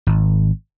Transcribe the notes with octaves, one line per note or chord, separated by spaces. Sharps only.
G#1